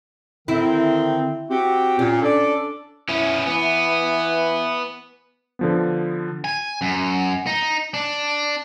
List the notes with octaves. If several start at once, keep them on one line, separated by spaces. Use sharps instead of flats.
D3 D#3 C4 E4
C4 F#4 G4
A#2 C#4
D4 A4 D5
B3 C#4 E4
E3 B3
D3 F3 B3
G#5
F#2
D#4
D4